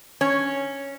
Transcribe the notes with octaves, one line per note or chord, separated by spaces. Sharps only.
C#4